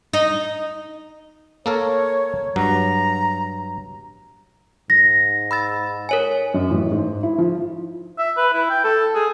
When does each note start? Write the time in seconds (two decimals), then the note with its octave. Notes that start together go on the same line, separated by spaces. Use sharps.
0.13 D#4
1.66 A#3 A4 A#4 C#5
2.56 G2 F#3 A#5
4.90 G#2 A#6
5.51 B5 E6 A6
6.09 A#4 C#5 G#5
6.54 F#2
6.70 A1
6.92 G#2
7.23 E4
7.38 F3
8.19 E5
8.37 B4
8.53 E4
8.70 G5
8.84 A4
9.15 G#4